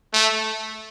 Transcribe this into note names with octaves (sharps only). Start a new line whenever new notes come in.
A3